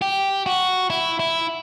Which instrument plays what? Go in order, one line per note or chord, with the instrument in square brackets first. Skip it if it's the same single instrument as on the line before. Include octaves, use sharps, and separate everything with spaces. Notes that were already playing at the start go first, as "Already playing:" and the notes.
[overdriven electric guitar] G4
F#4
E4
E4